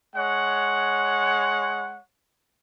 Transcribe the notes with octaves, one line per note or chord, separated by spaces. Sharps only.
G#3 C#5 F#5